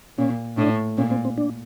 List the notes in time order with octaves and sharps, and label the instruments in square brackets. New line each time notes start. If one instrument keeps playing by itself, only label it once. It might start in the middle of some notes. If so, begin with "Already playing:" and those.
[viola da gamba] A#2 [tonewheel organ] C#4
[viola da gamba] A2 [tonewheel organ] D4
[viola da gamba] A#2 [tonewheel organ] C#4
[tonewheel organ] C4
C4
D4